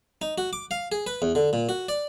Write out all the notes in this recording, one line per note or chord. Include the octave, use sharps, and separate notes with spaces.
D#4
F#4
D6
F5
G#4
B4
E2
D3
A#2
F#4
D5